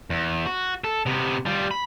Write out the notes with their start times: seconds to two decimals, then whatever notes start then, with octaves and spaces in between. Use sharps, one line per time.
0.10 E2
0.46 F#4
0.84 A4
1.06 C3 B3
1.46 G3 F4
1.71 B5